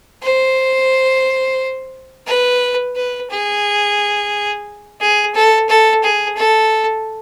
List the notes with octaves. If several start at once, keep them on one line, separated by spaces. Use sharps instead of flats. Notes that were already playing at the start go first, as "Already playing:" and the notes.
C5
B4
B4
G#4
G#4
A4
A4
G#4
A4